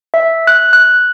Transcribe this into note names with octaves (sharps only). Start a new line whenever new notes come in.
E5
F#6
F#6